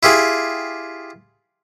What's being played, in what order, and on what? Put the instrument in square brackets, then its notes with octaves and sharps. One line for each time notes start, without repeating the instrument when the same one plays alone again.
[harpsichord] E4 F4 G4 G#4